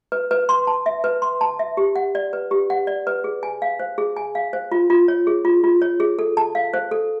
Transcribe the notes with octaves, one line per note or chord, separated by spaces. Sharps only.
B4
B4
C6
A5
E5
B4
C6
A5
E5
G4
F#5
D5
B4
G4
F#5
D5
B4
G#4
G#5
F5
C5
G#4
G#5
F5
C5
F4
F4
C#5
G#4
F4
F4
C#5
G#4
A4
A5
F5
C5
A4